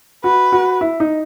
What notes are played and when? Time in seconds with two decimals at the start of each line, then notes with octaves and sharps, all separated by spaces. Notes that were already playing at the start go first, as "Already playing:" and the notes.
0.24 F#4 B4
0.52 F#4
0.81 E4
1.00 D#4